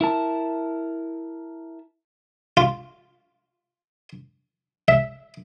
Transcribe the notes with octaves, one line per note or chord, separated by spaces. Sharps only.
E4 A#4 A5
F4
E5